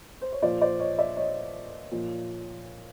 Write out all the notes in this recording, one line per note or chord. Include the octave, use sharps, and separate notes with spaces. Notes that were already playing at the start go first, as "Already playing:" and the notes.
C5
C#5
A#2 F3 C5 D5
C5 D5
C#5 D#5
D5 E5
C#5 D#5
A#2 F3